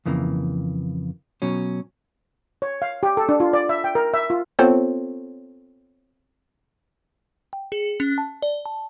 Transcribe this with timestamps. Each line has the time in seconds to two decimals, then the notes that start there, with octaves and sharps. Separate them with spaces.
0.06 F2 C#3 E3 A#3
1.42 B2 F#3 C#4
2.62 C#5
2.82 F5
3.03 G4
3.17 A4
3.29 D4
3.40 F4
3.53 D5
3.69 E5
3.84 G5
3.95 A#4
4.14 E5
4.30 F4
4.59 B3 C4 F4 A4 C5 C#5
7.53 G5
7.72 G#4
8.00 C#4
8.18 A5
8.42 D5
8.66 A5